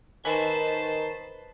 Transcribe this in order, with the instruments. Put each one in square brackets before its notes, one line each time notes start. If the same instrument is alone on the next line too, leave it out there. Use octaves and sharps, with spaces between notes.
[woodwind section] D#3 [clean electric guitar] B4 G#5 [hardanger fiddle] C5 A5